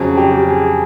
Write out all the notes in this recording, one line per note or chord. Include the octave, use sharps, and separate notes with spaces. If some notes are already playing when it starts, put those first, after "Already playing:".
Already playing: F2 C#3 F#3 G#4
G4
G#4